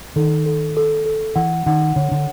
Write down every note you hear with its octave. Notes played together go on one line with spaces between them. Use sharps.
D#3 A4
A4
A4
A4
E3 F#5
D#3 F#5
D3 C#5
D3